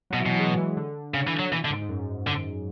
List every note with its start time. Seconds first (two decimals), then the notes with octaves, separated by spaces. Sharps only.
0.10 F#3
0.14 B2
0.20 E3
0.26 B2 F#3
0.39 G#3
0.57 E3
0.77 D3
1.14 C#3
1.27 E3
1.39 F#3
1.51 B2 E3
1.65 D3
1.70 G#2
1.82 G#2
1.89 F#2
2.27 D3